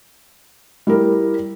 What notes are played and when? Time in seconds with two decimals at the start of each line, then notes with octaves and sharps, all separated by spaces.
0.87 G3 E4 G4 A#4